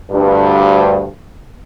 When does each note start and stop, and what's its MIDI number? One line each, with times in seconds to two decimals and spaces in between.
0.11 1.05 38
0.11 1.05 43